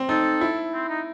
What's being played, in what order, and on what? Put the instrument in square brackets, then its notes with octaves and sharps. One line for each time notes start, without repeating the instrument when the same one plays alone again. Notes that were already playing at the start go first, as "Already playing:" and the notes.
Already playing: [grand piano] C4
[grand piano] D#4 [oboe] A4
[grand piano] E4
[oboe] C4
D#4